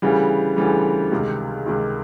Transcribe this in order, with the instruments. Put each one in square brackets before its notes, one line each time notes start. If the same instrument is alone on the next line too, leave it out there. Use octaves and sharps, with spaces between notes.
[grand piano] D2 C#3 E3 G3
D2 C#3 E3 G3
C#2 C3 D#3
C#2 C3 D#3